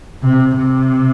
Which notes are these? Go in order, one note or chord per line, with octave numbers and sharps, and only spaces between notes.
C3
C3